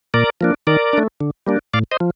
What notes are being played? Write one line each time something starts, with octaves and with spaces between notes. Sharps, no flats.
A#2 A#4 D5
F3 A#3 D4
D#3 A#4 D5
A3 D4
D3
G3 A#3 D4
A2 D5 F5
C5 D#5
F3